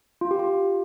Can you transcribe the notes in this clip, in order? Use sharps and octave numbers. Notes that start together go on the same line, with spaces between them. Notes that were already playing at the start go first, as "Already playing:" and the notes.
F4
G4
F4